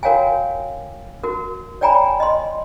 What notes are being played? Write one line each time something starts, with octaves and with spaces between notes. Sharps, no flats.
F#4 A#4 C#5 F5 G5 G#5
F#4 A#4
C#5 D5 G5 G#5 A#5 B5
D#5 C6